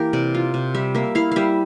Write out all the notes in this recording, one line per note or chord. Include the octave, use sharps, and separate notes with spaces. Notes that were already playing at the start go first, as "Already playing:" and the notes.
Already playing: E3 A#3 G4 A#4
C3 D5
F4
C3
G3 E5
A#3 E5
E4 F5
G3 E5 F5